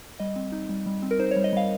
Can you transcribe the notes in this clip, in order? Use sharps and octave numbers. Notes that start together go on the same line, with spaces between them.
G3 D#5
C4
D#4
G3
G3
C4
A#4
D#4 C5
C#5
G3
D#5
G3 F5